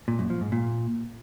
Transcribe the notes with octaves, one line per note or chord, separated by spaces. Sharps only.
A#2
F#2
F3
G#2
A#2